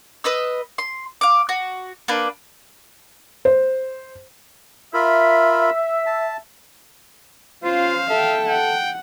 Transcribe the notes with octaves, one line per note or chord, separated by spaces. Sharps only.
B4 D#5 E6
C6
F5 D6
F#4
A#3 D4 B4
C5
F4 A#4 E5 B5
A5
C#4 F4 C5 F5
A4 E5 G5
F#5 G5